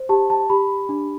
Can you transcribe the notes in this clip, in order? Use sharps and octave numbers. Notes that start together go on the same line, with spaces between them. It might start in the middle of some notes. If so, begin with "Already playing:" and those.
Already playing: C5
G4 A5
A5
G4 B5
D4